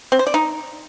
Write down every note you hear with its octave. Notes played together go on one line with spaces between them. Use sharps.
C4
C5
D5
D#4